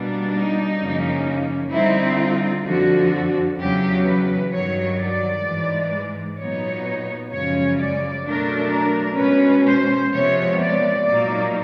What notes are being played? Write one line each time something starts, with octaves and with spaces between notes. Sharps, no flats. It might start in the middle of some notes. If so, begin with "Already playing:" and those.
Already playing: B2 G3 A#3 D4
D#4
F#2 C#3 F3 A#3 C#4
D3 G3 C4 D#4 E4
F4
F2 D3 F3 F#4
E2 C#3 F#3 G4
B4
G2 D#3 F#3 C#5
D5
G#2 E3 G#3
A#2 F#3 B3 D#4 C#5
F#2 C#3 F3 G#3 C#4 C#5
D5
B2 F#3 A3 D4 A#4
A#4
B2 G#3 C#4 B4
C5
C3 F3 G#3 B3 C#5
D5
A#2 F#3 A#3 D#4 D5